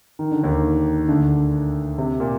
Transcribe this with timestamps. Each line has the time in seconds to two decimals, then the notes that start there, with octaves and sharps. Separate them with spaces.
0.19 D#3
0.31 D3
0.44 D#2 D#3
1.08 D2 D3
1.98 C3
2.20 A#2